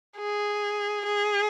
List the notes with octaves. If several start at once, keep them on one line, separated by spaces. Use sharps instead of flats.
G#4
G#4